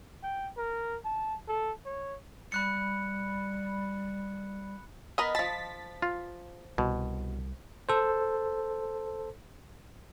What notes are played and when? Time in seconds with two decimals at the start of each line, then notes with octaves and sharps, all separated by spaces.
0.23 G5
0.57 A#4
1.05 A5
1.48 A4
1.85 C#5
2.52 G3 B5 F#6 C#7
5.18 B3 A#4 D#5 B5
5.35 F3 A5 A6 B6
6.02 F4
6.78 C2 B2
7.89 A4 C5